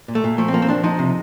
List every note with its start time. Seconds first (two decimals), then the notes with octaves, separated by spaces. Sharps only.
0.08 A#2
0.15 A3
0.24 A#2
0.38 F3 A3
0.48 C4
0.54 F3 A#3
0.62 C4
0.68 F3 D4
0.84 F3 D#4
0.99 C3